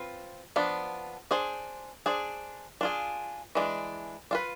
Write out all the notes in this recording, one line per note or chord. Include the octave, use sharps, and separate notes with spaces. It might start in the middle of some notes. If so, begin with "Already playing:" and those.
Already playing: C4 F4 B4
F3 B3 D4
D4 G#4 C5
D4 G#4 C5
D4 F4 G#4
E3 G#3 D4
D4 F4 B4